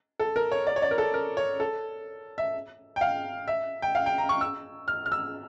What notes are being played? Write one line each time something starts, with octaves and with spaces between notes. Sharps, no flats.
A4
A#4
C#5
D5
C#5
D5
A#4
A4
A#4
C#5
A4
E5
G5
F5
E5
G5
F5
G5
A#5
C#6
E6
F6
F6
E6